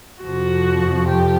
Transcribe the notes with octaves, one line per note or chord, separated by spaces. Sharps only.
F2 C3 F3 F#4
G4